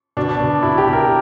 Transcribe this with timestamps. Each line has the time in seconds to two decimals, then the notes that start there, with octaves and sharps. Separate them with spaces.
0.17 B2 D4
0.40 B2
0.62 B2 E4
0.78 G4
0.86 B2
0.93 A#4